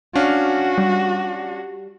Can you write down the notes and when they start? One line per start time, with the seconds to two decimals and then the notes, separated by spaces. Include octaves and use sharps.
0.15 C#4 D4 F#4 F5
0.78 G3